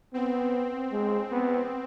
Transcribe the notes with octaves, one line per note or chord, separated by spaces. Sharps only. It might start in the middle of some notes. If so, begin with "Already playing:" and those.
B3 C4
G#3
B3